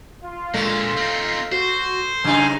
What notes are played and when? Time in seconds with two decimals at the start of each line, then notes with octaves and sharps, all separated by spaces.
0.24 F4
0.54 A#2 D3 G#3 A3
0.97 C4 D#4 C7
1.52 F#4 C5
2.24 F#2 C#3 A#3 D#4 G#5